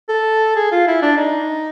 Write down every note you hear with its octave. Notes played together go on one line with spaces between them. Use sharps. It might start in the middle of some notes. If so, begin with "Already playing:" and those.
A4
G#4
F4
E4
D4
D#4